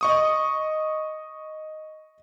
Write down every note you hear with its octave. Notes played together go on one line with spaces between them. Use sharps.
D#5 C#6 D#6